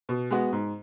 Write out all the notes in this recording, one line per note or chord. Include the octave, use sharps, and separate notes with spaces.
B2
G#3 B3 F#4
G#2